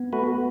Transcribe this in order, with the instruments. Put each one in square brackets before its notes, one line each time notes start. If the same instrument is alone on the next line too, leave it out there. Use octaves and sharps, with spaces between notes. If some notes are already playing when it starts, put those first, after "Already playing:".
Already playing: [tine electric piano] B3
[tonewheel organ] A3 F#4 B4